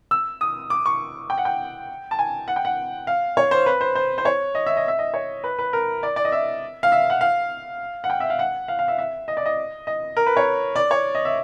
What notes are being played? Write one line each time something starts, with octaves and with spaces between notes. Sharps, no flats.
E6
D#6
D6
C#6
G5
F#5
G5
A5
G#5
F#5
G5
F#5
F5
C#5
C5
B4
C5
C5
C5
C#5
D#5
E5
D#5
E5
D#5
C#5
B4
B4
A#4
D5
D5
D#5
E5
F5
E5
F#5
F5
F#5
G5
E5
F5
F#5
F5
F5
E5
E5
D#5
D5
D#5
D#5
A#4
B4
C#5
D5
C#5
D#5
E5